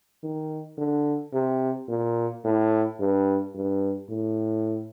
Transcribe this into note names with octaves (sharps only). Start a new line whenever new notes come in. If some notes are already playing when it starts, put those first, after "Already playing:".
D#3
D3
C3
A#2
A2
G2
G2
A2